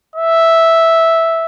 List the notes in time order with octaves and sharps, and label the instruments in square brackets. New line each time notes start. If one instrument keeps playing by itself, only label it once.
[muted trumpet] E5